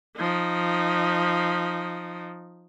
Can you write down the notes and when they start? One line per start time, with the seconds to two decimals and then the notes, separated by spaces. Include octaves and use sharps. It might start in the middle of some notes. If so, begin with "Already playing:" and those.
0.17 F3 D#4